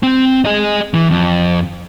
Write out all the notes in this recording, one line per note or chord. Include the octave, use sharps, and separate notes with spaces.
C4
G#4 D#5
E3
F2